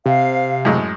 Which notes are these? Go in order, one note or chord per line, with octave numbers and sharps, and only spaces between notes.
C3 F5
F#2 A2 G#3